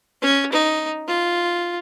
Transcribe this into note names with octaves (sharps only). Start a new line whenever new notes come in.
C#4
D#4
F4